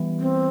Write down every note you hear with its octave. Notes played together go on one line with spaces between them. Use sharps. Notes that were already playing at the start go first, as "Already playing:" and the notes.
Already playing: E3 G3 B3
C4